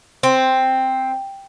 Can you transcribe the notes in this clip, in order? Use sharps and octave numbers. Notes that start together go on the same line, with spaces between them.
C4